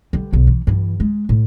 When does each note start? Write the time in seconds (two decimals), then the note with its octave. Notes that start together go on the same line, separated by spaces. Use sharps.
0.13 D3 G3
0.33 B1 B3
0.47 E3
0.67 G2 E3
1.00 G#3
1.29 A2